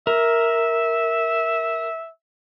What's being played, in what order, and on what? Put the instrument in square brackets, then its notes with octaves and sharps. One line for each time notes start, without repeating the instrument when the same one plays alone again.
[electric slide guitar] A#4 [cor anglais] E5